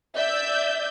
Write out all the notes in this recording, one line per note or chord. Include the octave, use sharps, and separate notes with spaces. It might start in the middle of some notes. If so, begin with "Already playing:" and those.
D5 E5 G6